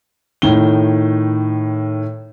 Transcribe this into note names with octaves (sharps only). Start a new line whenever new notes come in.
A2 D#3 G7